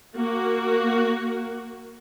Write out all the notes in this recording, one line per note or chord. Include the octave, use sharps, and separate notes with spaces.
A#3 F#4